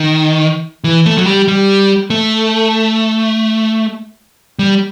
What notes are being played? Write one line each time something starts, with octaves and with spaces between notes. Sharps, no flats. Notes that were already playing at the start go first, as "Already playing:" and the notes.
Already playing: D#3
E3
A3
F#3
G3
G3
A3
G3